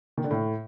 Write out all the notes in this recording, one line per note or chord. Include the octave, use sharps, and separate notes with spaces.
D#3
D3
A2